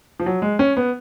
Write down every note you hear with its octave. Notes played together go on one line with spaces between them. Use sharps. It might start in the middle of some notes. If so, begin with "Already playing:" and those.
F3
F#3
G#3
C#4
B3